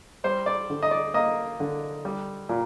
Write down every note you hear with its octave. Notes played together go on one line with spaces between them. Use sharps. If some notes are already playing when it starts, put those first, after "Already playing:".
G3 C5
D5
D3
D#5
D5
A#3 D#5
D3
G3
A#2